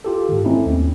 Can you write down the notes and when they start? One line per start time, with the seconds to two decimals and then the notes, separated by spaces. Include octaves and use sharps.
0.05 F4 G4 A4
0.29 G#2 D#3
0.45 A3 C4 C#4 D#4 E4 A4
0.66 D#2